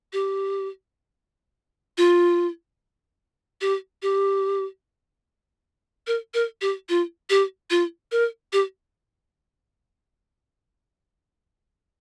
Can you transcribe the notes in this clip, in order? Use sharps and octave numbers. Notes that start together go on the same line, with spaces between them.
G4
F4
G4
G4
A#4
A#4
G4
F4
G4
F4
A#4
G4